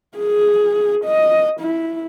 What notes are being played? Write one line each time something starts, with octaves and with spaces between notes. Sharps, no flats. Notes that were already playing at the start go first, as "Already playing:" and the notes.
G#4
D#5
E4